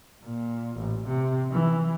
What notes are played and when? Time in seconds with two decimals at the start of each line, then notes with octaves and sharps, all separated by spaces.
0.24 A#2
0.77 A1
1.07 C3
1.52 E3